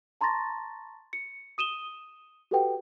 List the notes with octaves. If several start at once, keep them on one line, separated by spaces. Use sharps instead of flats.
A5 A#5 C6 C#6 A6 A#6
C#7
D#6 D#7 E7 G7
F#4 G4 A4 B4 F#5 G5